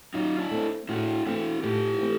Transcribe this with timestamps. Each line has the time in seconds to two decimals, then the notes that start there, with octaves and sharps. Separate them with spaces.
0.14 F#3 D#4 F4
0.39 D4 E4
0.51 A3 C4
0.89 A2 E4 F#4
1.26 E3 A3 C4 E4 F#4
1.64 A2 F4 G4
2.01 E3 A3 C4